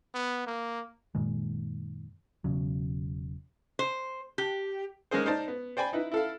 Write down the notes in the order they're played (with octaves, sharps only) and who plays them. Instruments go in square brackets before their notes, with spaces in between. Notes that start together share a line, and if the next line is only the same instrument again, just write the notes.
[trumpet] B3
A#3
[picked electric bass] F#2 A#2 D#3 G#3
E1 E2 C#3 F#3
[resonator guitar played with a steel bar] C5
G4
[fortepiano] G#3 A#3 C#4 G#4 C5
D#4 C5 D5 A5
B3
C5 D5 G5 G#5 B5
D#4 E4 B4
E4 A4 F5